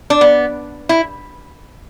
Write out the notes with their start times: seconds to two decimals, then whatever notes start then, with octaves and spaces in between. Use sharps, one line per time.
0.10 D4
0.21 B3
0.89 E4